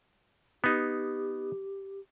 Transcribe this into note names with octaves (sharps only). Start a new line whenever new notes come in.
B3 D#4 G4